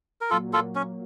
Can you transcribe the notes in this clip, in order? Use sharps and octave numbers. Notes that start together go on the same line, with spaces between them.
A#4
A#2 F#3 A#3 F4 A4
F4 A4
C#4